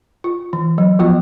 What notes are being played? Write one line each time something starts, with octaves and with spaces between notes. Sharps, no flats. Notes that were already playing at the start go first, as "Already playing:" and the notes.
F4
E3
F#3
F3 B3 F4 F#4